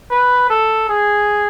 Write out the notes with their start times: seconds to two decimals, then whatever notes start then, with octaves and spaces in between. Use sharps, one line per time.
0.11 B4
0.50 A4
0.89 G#4